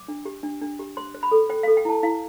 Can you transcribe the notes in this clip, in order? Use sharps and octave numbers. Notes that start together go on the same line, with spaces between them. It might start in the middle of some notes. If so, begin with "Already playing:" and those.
Already playing: D6
D4
G4
D4
D4
G4
C5 C6
C5
B5
A4
C5 G5
A4 F5
G5
E4 A5
E4 F5